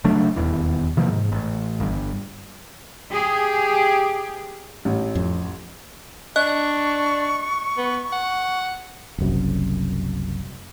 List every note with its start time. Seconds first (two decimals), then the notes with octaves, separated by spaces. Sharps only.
0.04 C#3 F#3 A3 D4
0.36 D#1 E2 E3
0.97 C3 E3 F3 A#3
1.09 G#2
1.32 A1
1.80 G1 G2
3.09 G4 G#4
4.85 A1
5.15 F2
6.36 D4 D#5 C#6 F#6
7.77 B3
8.12 F#5
9.18 F#1 C2 F#2